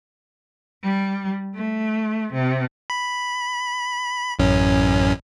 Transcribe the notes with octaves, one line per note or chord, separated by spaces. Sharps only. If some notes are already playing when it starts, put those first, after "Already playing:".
G3
A3
C3
B5
A1 F#2 C#4